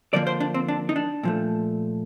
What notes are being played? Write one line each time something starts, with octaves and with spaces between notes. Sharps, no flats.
D3 F3 A#3 D5
C5
D4
C4
D4
D#4
D4
A#2 F3 A3